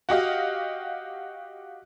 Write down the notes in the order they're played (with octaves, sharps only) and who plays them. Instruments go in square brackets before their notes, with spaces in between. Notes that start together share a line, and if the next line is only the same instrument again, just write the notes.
[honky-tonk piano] F#4 G4 D#5 F5